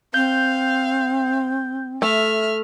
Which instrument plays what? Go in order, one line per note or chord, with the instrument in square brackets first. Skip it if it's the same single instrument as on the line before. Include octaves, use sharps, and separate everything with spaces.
[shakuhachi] C4 [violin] F5 [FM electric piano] G6
[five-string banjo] A3 [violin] E5 F6